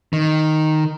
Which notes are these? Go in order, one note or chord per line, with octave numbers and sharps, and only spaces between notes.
D#3